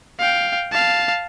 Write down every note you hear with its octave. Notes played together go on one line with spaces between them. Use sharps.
F5 G5
F5 A5